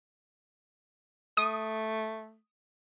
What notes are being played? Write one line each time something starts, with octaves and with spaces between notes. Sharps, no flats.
A3 D#6